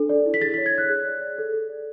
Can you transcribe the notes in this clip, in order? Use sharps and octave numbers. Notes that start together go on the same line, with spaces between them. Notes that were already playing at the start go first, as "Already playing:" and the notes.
Already playing: D4 A4
D5
E4
B6
G#4 A6
B6
C#5
G#6
C#5 F#6
G#4
D5
D5
A4
A4
D5